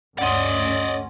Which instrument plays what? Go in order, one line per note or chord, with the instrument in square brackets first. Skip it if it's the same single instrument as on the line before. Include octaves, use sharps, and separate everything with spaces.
[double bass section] D2 G2 C#4 [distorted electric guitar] D5 D#5 [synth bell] F#5 C6